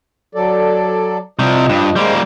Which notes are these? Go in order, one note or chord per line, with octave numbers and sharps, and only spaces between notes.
F#3 A4 D5
C3 F3 G3 D#5
G2
G3 G#3 A#3 C5